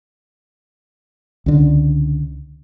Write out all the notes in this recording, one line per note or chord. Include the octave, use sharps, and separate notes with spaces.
C#2 D3